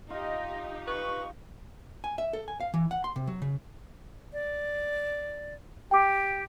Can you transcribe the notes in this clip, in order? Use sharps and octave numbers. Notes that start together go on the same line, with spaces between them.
D#4 F4 G4 D#5
B4 C#6
G#5
E5
A4
G#5
F5
E3
F#5
C6
C3
F#3
C#3
D5
G4 G5 D6